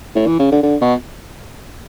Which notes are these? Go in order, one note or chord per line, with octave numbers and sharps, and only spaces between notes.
A2
E3
C#3
D3
D3
B2